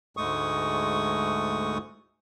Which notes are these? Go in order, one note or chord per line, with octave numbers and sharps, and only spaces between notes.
D2 G#2 G#3 A3 C#6 D#6